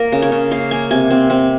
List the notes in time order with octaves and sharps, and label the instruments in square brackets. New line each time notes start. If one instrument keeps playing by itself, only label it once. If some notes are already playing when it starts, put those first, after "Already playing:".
Already playing: [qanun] A#3 A#4
C#3
C#5
C#3
A#3 F5
A#3 G#5
C3 G#5
C4
C4